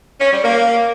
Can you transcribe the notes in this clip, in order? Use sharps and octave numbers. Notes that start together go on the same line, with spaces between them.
C#4
G3
A#3